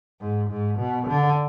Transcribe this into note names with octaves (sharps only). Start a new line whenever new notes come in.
G#2
G#2
B2
D3